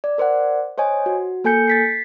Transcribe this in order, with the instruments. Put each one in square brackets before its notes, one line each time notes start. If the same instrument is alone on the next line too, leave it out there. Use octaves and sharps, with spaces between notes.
[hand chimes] D5
A#4 C5 D5 F#5
C5 C#5 D#5 G#5
F#4
A#3 A4 G#5 G6 C#7
A6 B6 C7